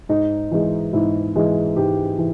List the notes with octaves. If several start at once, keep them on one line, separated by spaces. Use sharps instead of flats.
G#2 D#4
E3 G#3
G#2 E4
E3 G#3
G#2 G4
E3